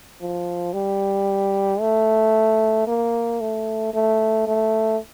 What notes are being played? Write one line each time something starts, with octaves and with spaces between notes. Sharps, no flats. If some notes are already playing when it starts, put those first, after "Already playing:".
F3
G3
A3
A#3
A3
A3
A3